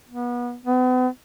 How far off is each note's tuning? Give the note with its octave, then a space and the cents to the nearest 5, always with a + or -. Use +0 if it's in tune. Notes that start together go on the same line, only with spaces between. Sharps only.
B3 -30
B3 +40